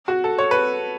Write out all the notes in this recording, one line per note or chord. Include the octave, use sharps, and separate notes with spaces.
F#4
A4
C#5
B4